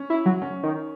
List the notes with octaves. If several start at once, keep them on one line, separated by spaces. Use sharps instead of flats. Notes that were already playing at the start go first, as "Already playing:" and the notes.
Already playing: C#4
E4
F#3
C#4
D#3